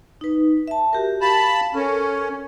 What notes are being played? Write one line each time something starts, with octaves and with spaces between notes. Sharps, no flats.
D#4 B4
E5 A5
F#4 G4 A#4
F5 A5 B5
C#4 A4 A#4